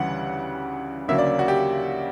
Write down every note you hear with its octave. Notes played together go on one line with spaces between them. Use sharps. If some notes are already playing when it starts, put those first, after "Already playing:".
Already playing: D2 C#3 E3 G3 F#5
D2 C#3 F#3 A#3 E5
D5
F#4
G4